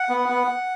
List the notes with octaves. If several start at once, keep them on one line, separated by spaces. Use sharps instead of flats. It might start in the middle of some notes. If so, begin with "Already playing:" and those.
Already playing: F#5
B3
B3